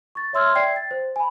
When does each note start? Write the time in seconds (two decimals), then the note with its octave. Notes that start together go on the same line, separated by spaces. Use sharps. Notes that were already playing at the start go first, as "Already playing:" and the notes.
0.15 C#6 A6
0.33 C#5 E5 C6 E6 F6 G#6
0.55 D5 E5 G5 G#6 C7
0.76 A6
0.91 C5
1.16 G#5 B5